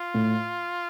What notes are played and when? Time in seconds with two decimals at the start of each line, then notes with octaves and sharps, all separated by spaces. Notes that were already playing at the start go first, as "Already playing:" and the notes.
Already playing: F4
0.14 A2